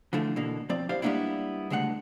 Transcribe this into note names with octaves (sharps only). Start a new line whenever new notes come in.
D3 E3 F3 A3
B2 D3 E3 A#3
F3 C4 D5
E4 G4 C5 D5 F5
G3 G#3 A#3 B3 D4 E4
C#2 D3 G#3 A3 F#5